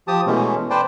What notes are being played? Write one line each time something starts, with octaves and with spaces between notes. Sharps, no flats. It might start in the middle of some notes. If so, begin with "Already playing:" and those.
F3 G4 A5 D#6
B2 E3 G#3 A3 C#4
B4 C5 D5 G5 A5